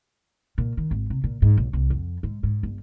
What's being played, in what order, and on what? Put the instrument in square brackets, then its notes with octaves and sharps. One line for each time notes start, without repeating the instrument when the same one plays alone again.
[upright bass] A#2
D#3
G#1
C3
A#2
G#2
B1
C2
F2
G#2
G#2
G1